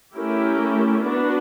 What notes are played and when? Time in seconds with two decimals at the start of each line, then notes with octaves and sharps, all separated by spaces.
0.15 A3 C#4 E4 G4 A#4
1.03 B3 D4 F#4